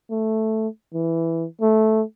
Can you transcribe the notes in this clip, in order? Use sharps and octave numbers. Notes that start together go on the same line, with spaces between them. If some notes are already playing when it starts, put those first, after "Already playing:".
A3
E3
A3